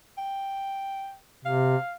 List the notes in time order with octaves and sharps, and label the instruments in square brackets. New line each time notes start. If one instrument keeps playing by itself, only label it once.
[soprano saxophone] G5
[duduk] C3 [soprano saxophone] F5